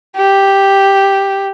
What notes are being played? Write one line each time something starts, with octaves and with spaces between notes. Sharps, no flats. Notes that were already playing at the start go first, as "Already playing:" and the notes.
G4